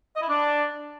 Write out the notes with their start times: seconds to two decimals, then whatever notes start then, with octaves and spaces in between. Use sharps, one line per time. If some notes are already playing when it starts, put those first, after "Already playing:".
0.16 D#5
0.22 E4
0.28 D4